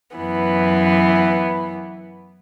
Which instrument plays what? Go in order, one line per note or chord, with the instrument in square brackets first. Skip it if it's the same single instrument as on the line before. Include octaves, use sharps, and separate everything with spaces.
[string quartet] F#2 E3 B3